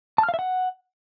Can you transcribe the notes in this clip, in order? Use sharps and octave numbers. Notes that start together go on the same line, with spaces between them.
A5
F6
F5
E5
F#5